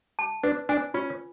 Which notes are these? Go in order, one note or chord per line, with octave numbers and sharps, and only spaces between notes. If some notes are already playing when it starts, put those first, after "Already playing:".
A5
D4 B4
D4 G#5
C#4 F4